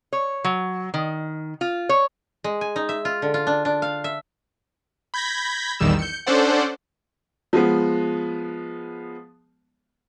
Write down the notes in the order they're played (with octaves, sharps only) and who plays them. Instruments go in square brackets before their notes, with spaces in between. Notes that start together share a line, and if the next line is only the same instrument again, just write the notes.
[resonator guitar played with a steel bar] C#5
F#3
D#3
F4
C#5
[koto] G#3
G#5
D#4
E5
F4
D3
F4
D4
D4
F5
E5
[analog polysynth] B5 G6 G#6 A#6 B6
A#1 E2 D#3 G3 E6 E7
G6 C#7
C#4 D4 A4 C5 D5 F#5
[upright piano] F3 G#3 B3